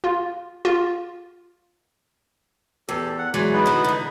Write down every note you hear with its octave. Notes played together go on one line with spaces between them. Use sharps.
F4
F4
E2 G4 A4
F#5
E3 F#3 G#3 D5
B3 D#4 B4
D3 F#4
D3 E3